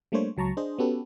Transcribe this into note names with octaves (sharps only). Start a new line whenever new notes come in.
G3 A3 A#3 D4 C5 C#5
C#2 F#3 A5 A#5 C#6
D4 G#4 C5 D#5
B3 C#4 F#4 G4 A4 B4